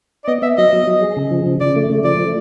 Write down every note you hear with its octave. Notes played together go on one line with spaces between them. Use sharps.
D5
B3 D#5
B3 E5
F#3 D#5
F#3
F#3
G#4
C#3
F3
C#3
C#3 D5
A3
C#3
F3 D5
A3